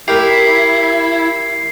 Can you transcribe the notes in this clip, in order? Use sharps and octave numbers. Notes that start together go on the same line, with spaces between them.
E4 G4 A#4 D6 C7